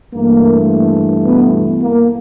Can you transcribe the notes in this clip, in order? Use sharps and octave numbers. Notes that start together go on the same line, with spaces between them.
G2 E3 A3 A#3
B2 B3
A#3